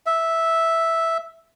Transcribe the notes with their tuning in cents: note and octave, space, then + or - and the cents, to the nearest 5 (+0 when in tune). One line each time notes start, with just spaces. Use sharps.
E5 -5